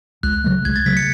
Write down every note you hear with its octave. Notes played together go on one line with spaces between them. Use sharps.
C#2 F#6
C#3 F#3 A3
C#2 G#6
A6
C#3 F#3 A3 B6
C#7